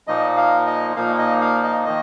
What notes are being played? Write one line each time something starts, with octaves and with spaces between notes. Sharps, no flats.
A#2 F3 A#3 D#4 D#5
F5
D#5
A#2 F3 A#3 D#4 F5
D#5
F5
D#5
D#3 A#3 D#5